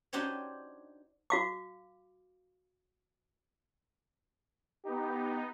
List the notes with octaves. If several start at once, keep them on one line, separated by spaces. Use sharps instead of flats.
D4 D#4 F#4 G4 C5 C#5
F#4 F5 D6
B3 D#4 G4